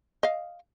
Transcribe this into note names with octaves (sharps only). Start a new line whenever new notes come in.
D#5 F5